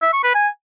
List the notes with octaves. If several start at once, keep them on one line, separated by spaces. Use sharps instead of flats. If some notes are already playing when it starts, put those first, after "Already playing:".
E5
C#6
B4
G#5